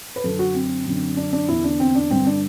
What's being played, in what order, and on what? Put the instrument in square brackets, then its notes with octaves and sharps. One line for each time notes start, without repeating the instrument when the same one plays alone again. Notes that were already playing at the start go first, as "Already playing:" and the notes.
[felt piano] B4
F#2 D3 A4
F#4
C4
F#2 D3
D4
D4
E2 D3 E4
D4
C4
D4
G2 D3 C4
D4